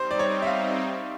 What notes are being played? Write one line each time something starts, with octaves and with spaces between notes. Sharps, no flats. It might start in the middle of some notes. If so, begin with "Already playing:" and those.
Already playing: G3 C4 D#4 C5
D5
C#5
E5
F5